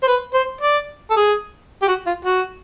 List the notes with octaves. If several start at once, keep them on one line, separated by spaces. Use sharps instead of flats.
C5
B4
C5
D5
A4
G#4
G4
F#4
F4
F#4